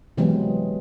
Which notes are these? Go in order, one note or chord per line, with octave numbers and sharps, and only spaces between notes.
C3 E3 F#3 G#3 B3 C4